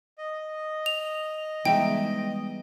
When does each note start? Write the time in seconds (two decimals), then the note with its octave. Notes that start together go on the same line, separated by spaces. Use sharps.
0.18 D#5
0.86 F7
1.65 E3 G3 G#3 B3 D#4 E5 G5